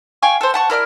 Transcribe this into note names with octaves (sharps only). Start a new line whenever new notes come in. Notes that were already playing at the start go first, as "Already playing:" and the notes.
F5 G5 G#5 C#6
A4 C5
F#5 A5 C#6
E4 A#4 D5 F6